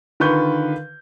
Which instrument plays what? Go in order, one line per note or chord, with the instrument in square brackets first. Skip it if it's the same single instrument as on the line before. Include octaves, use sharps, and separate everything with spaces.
[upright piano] D3 D#3 F4 B4 C#6 G6